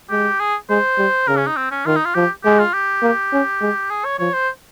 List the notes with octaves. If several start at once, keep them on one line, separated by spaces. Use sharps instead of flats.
G#3 G4
G#4
G#3 C5
G3
C#3 A#4
C#4
D#4
C4
C#4
D#3 F4
D#4
F4
F3 G4
G#3 G4
F4
G4
A#3
C#4
G#3
G#4
C#5
F3 C#5
C5